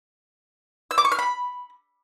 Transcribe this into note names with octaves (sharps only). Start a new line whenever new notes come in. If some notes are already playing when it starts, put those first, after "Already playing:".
E6
D6
C#6
F6
B5